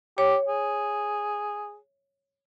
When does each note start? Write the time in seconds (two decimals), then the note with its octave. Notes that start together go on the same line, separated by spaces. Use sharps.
0.18 G4 C#5
0.48 G#4